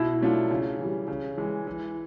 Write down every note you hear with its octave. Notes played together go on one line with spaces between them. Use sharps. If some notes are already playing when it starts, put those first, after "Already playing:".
Already playing: B2 E4
F#3 A3 D4 F4
C#3
E3 G3
C#3
E3 G#3
E3